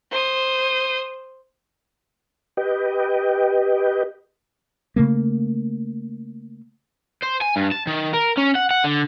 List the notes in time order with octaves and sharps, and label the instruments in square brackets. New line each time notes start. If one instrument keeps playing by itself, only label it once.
[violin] C5 D#6
[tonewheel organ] G4 B4 D#5 G5
[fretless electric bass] C#3 A3 A#3
[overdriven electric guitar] C5
G#5
G2
A5
D#3
A#4
C#4
F#5
F#5
D3